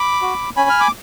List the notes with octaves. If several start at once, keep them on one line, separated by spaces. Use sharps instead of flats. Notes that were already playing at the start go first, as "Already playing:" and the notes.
Already playing: B5 D6
F#4
C#4 G#5 B5
F6
D6